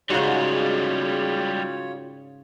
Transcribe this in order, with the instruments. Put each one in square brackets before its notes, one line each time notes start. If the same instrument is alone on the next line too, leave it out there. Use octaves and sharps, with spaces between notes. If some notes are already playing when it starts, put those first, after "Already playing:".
[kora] G#2 C#3 [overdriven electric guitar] G3 G#3 [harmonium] F4 C#5 [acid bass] F#4